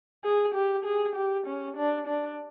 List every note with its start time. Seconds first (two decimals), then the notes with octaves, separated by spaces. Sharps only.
0.24 G#4
0.54 G4
0.85 G#4
1.15 G4
1.46 C#4
1.77 D4
2.07 D4